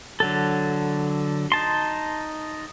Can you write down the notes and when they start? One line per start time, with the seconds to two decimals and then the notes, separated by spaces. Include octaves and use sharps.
0.20 D3 F#3 A4
1.52 D#4 A5 C6